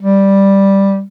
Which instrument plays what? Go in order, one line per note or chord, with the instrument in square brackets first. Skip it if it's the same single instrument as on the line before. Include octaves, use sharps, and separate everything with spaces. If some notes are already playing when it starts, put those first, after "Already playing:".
[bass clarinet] G3